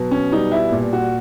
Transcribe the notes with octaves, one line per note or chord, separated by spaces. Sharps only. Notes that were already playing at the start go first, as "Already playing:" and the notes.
Already playing: B2 F#3
C#4
G3 D#4
E4
A#2
F#4